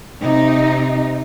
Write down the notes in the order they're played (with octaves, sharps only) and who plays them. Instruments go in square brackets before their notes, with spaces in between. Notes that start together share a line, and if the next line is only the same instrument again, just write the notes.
[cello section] C3 D#4